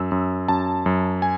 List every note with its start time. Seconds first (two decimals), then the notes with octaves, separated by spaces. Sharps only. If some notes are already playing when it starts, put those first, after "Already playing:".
Already playing: F#2 E6
0.12 F#2
0.48 F#2 A5
0.86 F#2
1.22 G#5